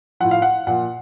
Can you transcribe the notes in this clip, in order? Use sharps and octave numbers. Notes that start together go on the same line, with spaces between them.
A2 F3 F#5
F5
F#5
A#2 F3 F#5